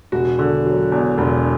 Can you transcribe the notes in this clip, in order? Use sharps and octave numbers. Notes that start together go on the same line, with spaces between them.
E1 F#4
D3
F#3
E2
E1